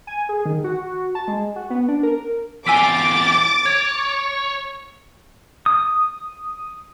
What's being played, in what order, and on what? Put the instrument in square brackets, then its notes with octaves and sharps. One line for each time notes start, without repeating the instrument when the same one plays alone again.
[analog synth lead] G#5
G#4
D#3
F#4
A5
G#3
F#4
B3
D4
A#4
[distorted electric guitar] E2 F4 [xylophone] G#5 E6 B6 [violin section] D6 A6
[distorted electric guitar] C#5 [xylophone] G#6
[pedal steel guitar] D#6